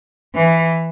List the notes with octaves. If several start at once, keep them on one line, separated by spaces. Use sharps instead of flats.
E3